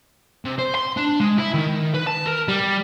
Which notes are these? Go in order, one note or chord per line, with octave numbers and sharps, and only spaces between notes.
C3
C5
C6
D4
G#3
E4
D#3
B4
A5
A#4
G3